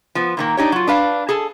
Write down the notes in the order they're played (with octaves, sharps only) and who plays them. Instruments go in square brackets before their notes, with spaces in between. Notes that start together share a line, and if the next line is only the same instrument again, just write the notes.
[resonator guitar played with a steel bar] F3 B3
A#2 D#3 A#3
D4 D#4 G4 C#5
F#3 F4
D4 B4 F5
G#4 A4 A5